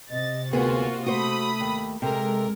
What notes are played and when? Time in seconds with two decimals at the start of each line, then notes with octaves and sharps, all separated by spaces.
0.10 C3 D#5 A6
0.53 D2 A#3 B3 F4 F#4 G#4 A#4
1.06 A3 F#4 C5 B5 D#6
1.60 D#2
2.02 C3 G#3 A4 A#4